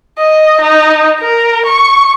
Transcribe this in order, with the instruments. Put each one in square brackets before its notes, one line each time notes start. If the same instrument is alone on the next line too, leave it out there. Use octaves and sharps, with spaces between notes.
[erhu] D#5
D#4
A#4
C#6